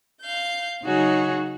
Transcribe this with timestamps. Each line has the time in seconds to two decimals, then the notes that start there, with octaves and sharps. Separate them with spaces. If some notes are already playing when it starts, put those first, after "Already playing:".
0.21 F5 G6
0.85 C#3 F#3 D#4 F#4 G#4 C#5